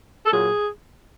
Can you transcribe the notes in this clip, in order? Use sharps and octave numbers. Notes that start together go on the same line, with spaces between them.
A4
A#2 F#3 A#3 G#4